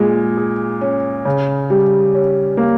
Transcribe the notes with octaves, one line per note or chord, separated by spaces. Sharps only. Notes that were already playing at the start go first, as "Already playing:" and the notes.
Already playing: A#2 G#3
G#4
C#4
C#3
G3
C#4
A#3